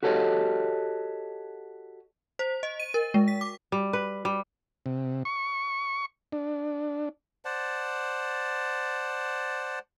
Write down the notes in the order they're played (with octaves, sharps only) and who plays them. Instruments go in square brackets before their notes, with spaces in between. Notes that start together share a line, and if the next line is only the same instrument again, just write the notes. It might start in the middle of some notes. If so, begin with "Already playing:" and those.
[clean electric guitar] F#4 G4 A4 C#5 D#5
[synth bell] C5
D#5
D#7
A#4
G#3
B6
D6
[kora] G3
B4
G3
[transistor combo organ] C3
C#6
D4
[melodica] C5 D5 F#5 A5